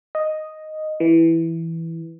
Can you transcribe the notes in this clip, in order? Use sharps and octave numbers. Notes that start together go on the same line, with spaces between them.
D#5
E3